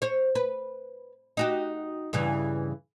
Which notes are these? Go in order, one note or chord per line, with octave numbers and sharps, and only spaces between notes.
C5 C#5
B4
D#4 F#4 G4
G2 C#3 E3